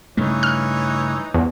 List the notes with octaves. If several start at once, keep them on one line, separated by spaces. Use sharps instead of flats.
G2 C#3 E3 A3 D#4 C#5
F6
E2